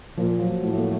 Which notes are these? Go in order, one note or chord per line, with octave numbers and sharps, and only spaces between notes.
A#2 F3
F#3
A2 A3
A#3